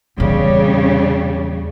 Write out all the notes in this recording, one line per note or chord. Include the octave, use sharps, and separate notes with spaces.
E2 A#2 C#3 G3